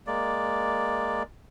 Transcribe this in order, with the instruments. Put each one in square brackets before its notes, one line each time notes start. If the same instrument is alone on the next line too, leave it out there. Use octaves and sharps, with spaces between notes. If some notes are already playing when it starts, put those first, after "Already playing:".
[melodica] G#3 A#3 D5